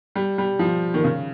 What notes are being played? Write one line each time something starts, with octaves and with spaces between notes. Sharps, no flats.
G3
G3
F3
D#3
C#3